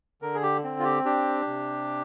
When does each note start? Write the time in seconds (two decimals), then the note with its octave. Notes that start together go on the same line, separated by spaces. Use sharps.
0.22 D3 A#4
0.35 G#4
0.43 G4
0.64 C4
0.79 F4
0.84 G4
1.05 D4 G4
1.47 C3